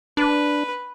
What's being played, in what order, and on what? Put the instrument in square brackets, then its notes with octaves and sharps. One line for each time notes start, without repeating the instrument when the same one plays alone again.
[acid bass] D4 [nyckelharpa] B4